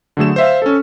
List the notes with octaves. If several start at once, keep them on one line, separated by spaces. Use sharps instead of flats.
D3 F#3 A3 G#4 E7
C5 E5 F5
C#4 A4